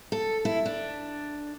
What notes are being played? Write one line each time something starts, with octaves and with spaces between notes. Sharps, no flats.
A4
E4
D4